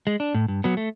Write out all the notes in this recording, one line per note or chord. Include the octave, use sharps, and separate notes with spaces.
G#3
D4
A2
G2
F#3 B3
A3